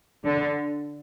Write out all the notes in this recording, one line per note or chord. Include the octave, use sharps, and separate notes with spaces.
D3